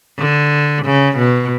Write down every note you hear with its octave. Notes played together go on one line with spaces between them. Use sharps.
D3
C#3
B2